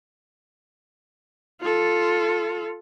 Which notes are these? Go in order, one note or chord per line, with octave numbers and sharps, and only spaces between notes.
F4 A4